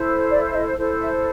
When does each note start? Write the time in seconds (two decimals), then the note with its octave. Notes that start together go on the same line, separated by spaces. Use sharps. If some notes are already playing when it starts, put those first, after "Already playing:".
Already playing: E4 A4 C5
0.30 D5
0.49 E5
0.52 D#5
0.76 E4 A4 C5
0.99 E5